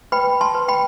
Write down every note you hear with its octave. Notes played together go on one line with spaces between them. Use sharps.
B4 G5 B5
A5 C6
B4
G5 B5